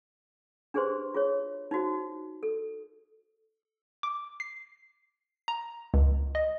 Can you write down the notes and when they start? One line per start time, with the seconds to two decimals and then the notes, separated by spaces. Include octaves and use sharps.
0.74 D4 G4 G#4 B4 C5 C6
1.14 F4 G#4 C#5
1.71 D#4 F4 F#4 C5
2.43 A4
4.03 D6
4.40 C7
5.48 A#5
5.94 C#2
6.35 D#5